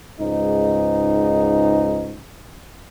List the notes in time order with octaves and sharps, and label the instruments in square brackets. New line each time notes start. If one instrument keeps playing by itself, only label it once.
[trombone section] C#2 G#2 D#4